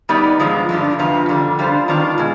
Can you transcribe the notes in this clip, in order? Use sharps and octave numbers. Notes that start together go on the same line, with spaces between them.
G3 B3 D#4 G4 D5
G2 F3 G#3
G2 D3 G3 D4 F4
F2 C3 F3 B3 F4
F2 D3 G3
G3 D4 F4 C5
D#3 B3 D4 F4
B2 G#3